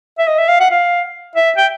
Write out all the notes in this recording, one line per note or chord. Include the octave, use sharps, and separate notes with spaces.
E5
D#5
E5
F5
F#5
F5
E5
G5